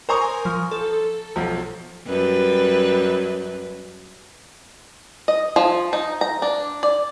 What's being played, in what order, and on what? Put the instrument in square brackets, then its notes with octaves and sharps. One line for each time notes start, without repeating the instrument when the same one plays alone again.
[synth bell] A#4 G#5 D#6 [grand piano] C5 A#5 C#6
[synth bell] F3
A4
[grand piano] B1 F3
[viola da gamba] F#2 G3 B4
[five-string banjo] D#5
F3
D#4
A#5
D4
D5